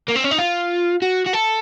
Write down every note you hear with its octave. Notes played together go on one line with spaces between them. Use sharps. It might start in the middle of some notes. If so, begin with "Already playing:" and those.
A#3
C4
C#4
D#4
F4
F#4
F#4
A4